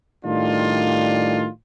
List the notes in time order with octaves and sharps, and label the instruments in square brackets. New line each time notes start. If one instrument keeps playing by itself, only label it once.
[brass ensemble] A2 D#3 G3 D4 F4